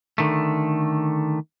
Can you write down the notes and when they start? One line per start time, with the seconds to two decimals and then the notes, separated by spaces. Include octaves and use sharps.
0.18 D3 D#3 A3